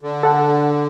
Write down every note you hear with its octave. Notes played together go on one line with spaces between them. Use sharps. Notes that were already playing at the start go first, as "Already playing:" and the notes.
D3
A4 F#5 A5